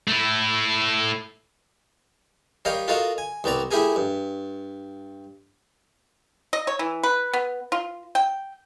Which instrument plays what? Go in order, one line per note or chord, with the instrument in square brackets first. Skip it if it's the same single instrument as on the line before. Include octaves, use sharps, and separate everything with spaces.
[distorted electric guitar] A3 E4
[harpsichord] G3 A#4 C#5 D#5 F5 G5
F4 F#4 A4 A#4 D#5 F5
G#5
C2 B3 C4 D5 A#5
A3 E4 G4 G#4 A#4 G#5
G2
[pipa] D#5
C#5
E3
B4
B3
F4
G5